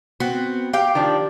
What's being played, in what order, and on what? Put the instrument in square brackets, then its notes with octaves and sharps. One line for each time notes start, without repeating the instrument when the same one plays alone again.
[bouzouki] B3 C4 [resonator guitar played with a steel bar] F#4
[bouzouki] G4 G5 [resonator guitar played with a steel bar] F5
[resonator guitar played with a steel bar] D#3 F3 D4